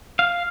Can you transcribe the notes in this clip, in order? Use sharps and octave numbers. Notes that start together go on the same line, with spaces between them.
F5